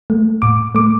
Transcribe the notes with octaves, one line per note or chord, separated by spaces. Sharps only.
A3
A2 D6
A3 D6